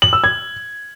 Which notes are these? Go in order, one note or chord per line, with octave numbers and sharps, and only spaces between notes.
F#7
E6
G#6